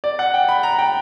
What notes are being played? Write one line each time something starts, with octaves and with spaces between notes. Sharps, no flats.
D5
F#5
G5
B5
A#5
G5